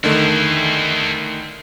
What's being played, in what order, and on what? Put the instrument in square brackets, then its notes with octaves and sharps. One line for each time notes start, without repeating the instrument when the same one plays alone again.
[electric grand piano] D3 D#3 A3 [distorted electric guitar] E4 G#4